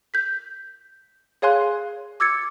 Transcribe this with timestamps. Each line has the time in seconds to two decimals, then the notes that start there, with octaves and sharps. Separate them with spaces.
0.14 G6 B6
1.42 G#4 C#5 F5 G#5 C6 F#6
2.20 D6 E6 G#6 A6 C#7